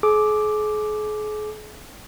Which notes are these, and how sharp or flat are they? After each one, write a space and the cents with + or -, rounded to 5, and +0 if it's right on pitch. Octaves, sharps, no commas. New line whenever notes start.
G#4 +40 D6 +5